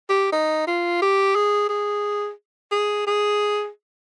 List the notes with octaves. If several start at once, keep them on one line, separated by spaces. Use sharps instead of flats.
G4
D#4
F4
G4
G#4
G#4
G#4
G#4